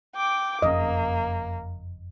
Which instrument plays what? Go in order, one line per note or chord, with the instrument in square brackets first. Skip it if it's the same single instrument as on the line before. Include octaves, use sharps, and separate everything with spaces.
[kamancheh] G5 D6
[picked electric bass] F#1 F2 C#4 [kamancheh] A#3 [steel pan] D#5